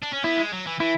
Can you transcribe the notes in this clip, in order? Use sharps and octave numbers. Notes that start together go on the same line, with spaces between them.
D4
C#4
B3 E4
G#3
F#3
E3
E3 E4